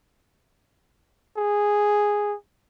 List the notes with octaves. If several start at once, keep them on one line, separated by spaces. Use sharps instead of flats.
G#4